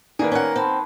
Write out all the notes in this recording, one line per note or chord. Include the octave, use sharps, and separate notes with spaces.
D#3 A#3 G#4 B4 D5
C#4 A#4 F#5
C4 A5 B5 C6